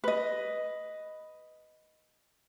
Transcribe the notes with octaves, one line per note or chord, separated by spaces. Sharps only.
B4 D#5